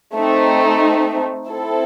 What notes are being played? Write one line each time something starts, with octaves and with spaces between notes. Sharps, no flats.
A3 C4 D#4
C4 E4 A4